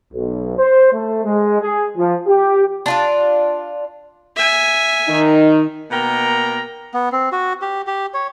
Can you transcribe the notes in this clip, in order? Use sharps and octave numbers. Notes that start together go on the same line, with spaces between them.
B1
C5
A3
G#3
G#4
F3
G4
D4 F4 D5
E5 G#5
D#3 D#4
B2 A#3 A#4 G5 A#5
B3
C4
F#4
G4
G4
C#5